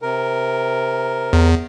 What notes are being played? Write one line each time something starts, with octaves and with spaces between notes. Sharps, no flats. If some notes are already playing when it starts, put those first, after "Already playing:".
C3 A#4
E2